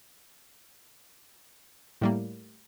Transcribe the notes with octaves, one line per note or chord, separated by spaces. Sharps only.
A2 G3 A#3